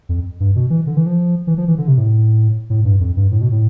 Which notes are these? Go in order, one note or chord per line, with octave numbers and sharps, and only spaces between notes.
F2
G2
B2
E3
D3
E3
F3
E3
F3
E3
D3
C3
A2
A2
G2
F2
G2
A2
B2
A2